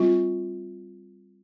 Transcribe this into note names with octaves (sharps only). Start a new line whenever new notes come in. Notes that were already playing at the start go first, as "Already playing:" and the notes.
Already playing: G3 C4 F4